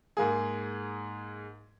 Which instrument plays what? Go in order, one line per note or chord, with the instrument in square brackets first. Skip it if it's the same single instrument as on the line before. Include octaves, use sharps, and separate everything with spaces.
[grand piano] G#2 A#3 G#4